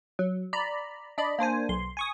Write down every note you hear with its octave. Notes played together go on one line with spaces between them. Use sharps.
F#3
D5 A#5 B5
D4 D5 D#5 B5
A#3 D4 C5 G#5
B1 C6
G#5 C#6 D#6